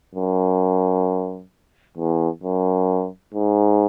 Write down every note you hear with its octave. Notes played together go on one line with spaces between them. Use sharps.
F#2
E2
F#2
G#2